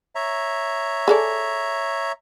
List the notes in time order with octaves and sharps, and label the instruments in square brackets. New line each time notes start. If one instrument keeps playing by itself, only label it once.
[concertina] C#5 E5 A#5
[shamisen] G#4 A4 D5